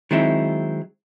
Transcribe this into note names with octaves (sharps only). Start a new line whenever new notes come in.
D#3 F#3 G#3 C4 E4